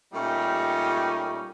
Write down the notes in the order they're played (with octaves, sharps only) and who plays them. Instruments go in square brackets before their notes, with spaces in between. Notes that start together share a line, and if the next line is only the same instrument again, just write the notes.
[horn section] A#2 G3 A3 C#4 D#4 G4